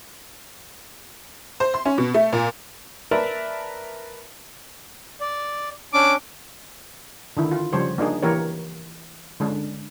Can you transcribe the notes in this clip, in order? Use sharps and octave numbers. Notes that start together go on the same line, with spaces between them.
C5
C6
C#4
B2
A3
A#2
A#4 B4 D5 E5 A5 A#5
D5
C#4 D4 D6
D3 D#3 E4
F4
C#3 F3 G3 C5 C#5
A#3 D4 D#4 G#4
E3 A#3 G4 A#4 C#5
D3 G#3 C#4 D4